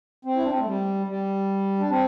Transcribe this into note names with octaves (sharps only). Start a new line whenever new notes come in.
C4
E4
D4
C4
A3
G3
G3
D4
C4